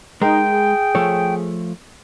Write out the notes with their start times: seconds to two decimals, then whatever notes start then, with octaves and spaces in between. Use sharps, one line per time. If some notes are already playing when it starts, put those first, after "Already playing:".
0.22 G#3 D#4 A#4 G5
0.50 G#4
0.95 F3 A3 C#5